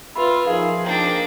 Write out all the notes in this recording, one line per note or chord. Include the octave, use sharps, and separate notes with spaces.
F4 B4 E5 B5
F3 D#4 G#4 A#4 F5
A#3 D4 G5